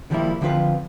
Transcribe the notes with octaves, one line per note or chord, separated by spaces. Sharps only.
D3 D#3 F3 G3 A#3 E4
D3 F3 C4 F4 B4